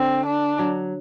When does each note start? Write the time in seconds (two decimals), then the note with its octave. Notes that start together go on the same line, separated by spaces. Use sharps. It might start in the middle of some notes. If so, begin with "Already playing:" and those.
Already playing: D3 C4
0.26 D4
0.59 F#3